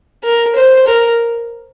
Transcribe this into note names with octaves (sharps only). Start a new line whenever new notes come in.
A#4
C5
A#4